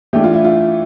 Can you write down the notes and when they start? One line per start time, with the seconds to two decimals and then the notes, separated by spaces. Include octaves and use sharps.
0.13 E3 A3 D4 G4
0.24 F4
0.34 E4
0.44 F4